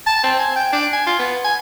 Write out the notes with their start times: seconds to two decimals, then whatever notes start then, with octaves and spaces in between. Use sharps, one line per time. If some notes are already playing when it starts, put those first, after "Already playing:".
0.07 A5
0.24 C4
0.39 G#5
0.56 G5
0.73 D4
0.93 G#5
1.07 F4
1.19 B3
1.44 G#5